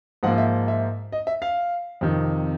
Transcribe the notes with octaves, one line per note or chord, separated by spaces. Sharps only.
G#2 F3 A#3 F#5
E5
E5
D#5
E5
F5
F2 C3 D#3